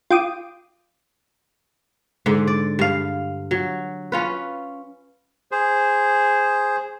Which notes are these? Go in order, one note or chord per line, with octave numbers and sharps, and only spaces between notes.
F4 G5 D6 D#6
G#2 D3
D5
G2 F5
F#3
C#4 F4 B4
G#4 C5